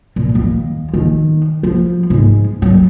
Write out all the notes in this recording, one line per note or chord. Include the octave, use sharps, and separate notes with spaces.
A#2
D#2
D#3
F3
G#2
F#3